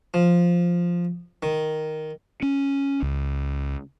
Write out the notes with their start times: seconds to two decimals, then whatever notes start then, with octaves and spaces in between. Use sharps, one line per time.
0.14 F3
1.43 D#3
2.42 C#4
3.02 C#2